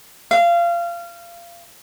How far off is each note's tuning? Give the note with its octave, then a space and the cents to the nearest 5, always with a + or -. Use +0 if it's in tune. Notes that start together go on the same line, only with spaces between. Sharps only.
F5 -25